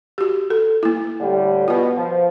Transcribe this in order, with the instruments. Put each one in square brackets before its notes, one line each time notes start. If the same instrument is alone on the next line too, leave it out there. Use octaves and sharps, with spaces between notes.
[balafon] F#4 G4
A4
A#3 E4
[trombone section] A2 D3 G3
[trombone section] B2 [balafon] F4 B4
[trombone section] F3